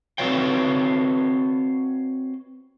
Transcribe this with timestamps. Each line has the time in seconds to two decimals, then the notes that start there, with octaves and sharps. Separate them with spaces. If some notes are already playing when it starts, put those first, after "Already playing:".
0.18 C4 F#4 B4 C#5 F5 G5